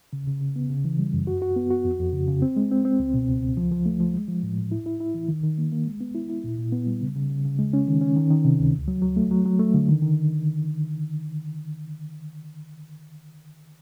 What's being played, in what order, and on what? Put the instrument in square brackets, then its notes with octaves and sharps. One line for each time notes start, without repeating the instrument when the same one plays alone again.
[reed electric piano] C#3
C#3
C#3
B3
C#3
E3
G3
F#2
F#4
F#4
B3
F#4
F2
F2
C#3
C#3
C4
G#3
C4
C4
C#2
B2
C#2
C#2
F3
F3
A3
F3
G#3
F3
A2
A2
E4
E4
E4
E3
D#3
D#3
A#3
A#3
G#3
B3
E4
E4
A#2
A#2
B3
G3
C#3
C#3
C#3
C#3
G#3
C#4
D#3
C#4
D#3
D#3
C3
C#2
D2
F#3
F#3
A3
F#3
F#3
A3
D3
D#3
D#3